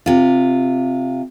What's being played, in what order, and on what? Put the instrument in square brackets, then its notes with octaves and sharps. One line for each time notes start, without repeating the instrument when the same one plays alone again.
[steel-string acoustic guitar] C3 F4